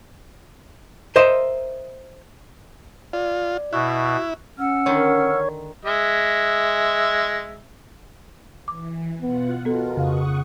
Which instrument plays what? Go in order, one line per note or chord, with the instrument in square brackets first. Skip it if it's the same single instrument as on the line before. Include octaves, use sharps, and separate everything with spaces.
[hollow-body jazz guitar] A#4 C5 D#5 E5 C6
[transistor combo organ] F4 [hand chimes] D5
[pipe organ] B2 [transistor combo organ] E4 [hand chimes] C#6 F#6
[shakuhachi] C#4 [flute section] F#5 E6 F6
[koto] D3 D#3 [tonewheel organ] C#5
[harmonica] G#3 E5
[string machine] E3 [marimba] D6
[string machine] B2 F4 F#5 [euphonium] B3
[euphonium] B2 [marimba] B3 A4 [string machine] F4 A#4
[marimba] F2 F5 [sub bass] C#3 [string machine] F#5 C#6 D#6